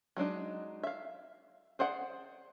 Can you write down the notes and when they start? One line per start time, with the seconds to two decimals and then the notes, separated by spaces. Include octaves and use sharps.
0.17 F#3 G#3 D4 D#4
0.83 E5 F5
1.79 G#4 C5 D5 F#5